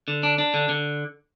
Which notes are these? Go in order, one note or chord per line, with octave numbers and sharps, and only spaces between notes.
D3
D4
D4
D3
D3